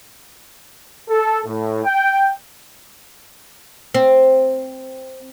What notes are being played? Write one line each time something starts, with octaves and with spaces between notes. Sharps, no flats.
A4
A2
G5
C4